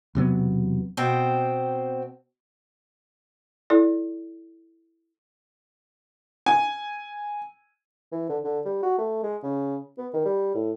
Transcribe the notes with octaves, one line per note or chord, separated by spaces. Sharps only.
E1 C3 F#3 B3
B2 C4 C5 G5
E4 A4 D5
G#5
E3
D3
D3
G3
F#4
A3
G#3
C#3
B3
D#3
G3
A2